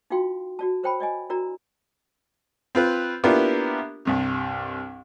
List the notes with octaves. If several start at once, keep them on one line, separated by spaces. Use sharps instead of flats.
D#4 F4 F#4 F5 G5 C6
F#4 D5 A5
A#4 C5 C#5 G5 A5 B5
D5 D#5 G#5
D4 E4 F#4 A#4 D5 A#5
C4 F4 B4
A#3 B3 D4 E4 F4 G4
C2 G2 C3